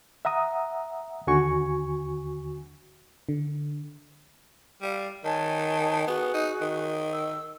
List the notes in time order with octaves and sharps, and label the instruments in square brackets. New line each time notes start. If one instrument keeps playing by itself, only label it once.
[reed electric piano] E5 F#5 A#5 D#6
D#2 D3 F#4 G#5 C#6
[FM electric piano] D3
[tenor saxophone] G3 [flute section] D5 F5
[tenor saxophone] D#3 [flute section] C#5 G#5 A5
[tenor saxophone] B3 [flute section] F#4 G#4
[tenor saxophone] D#4
D#3
[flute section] E6